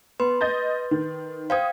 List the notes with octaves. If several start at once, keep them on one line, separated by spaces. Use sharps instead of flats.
B3 B4 C6
D#5 G6 A6
D#3
C5 F5 G5 D#6 G#6